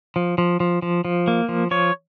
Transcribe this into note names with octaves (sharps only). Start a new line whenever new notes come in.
F3
F3
F3
F3
F3
A#3
F3
F3 C#5